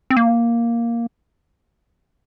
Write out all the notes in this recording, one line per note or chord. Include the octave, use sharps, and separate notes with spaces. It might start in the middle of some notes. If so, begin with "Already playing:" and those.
C4
A#3